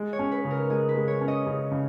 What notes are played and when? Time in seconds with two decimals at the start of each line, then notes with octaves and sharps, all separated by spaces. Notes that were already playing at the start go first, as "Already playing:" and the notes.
Already playing: G#3
0.13 C#5
0.19 C#4
0.31 B4
0.45 C#3
0.51 A#4
0.70 G#3 G#4
0.89 B4
0.96 G#3
1.08 C#5
1.21 C#4
1.28 D#5
1.46 C#3
1.72 C#3